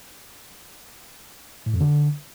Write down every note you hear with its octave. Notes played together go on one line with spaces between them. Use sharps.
A2
F2
D3